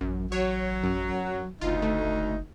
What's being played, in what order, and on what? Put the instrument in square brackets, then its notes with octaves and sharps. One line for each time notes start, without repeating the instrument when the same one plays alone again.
[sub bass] A1 [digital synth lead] F#2
[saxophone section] F#3 [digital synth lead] C#5
[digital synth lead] F#2
[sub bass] F#1 [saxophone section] D2 D#4 [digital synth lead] F4
[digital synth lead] A3